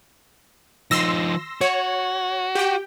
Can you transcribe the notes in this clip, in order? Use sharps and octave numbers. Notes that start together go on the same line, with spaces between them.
F3 D#4 C6 E6 A#6
F#4 C#5
G4 G5